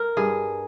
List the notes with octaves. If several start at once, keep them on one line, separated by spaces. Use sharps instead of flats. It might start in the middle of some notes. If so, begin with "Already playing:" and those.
Already playing: A#4
G2 G#4